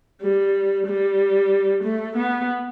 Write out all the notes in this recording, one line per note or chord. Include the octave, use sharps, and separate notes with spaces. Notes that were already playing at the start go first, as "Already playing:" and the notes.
G3
G3
A3
B3